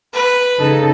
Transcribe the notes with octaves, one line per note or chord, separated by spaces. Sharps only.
B4
C#3 D#4 A4